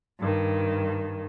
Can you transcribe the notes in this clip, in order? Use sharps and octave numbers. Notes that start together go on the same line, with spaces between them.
G2 D#3